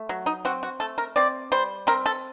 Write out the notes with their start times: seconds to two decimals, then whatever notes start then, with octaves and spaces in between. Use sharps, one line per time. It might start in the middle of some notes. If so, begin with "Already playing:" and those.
Already playing: A3
0.09 F#3
0.26 D#4
0.45 C4 F#4
0.63 F#4
0.80 A3 A4
0.98 A#4
1.16 C4 D5
1.52 G3 C5
1.87 C4 A#4
2.06 A4